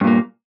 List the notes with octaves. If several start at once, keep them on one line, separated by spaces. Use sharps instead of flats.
G2 A#2 A#3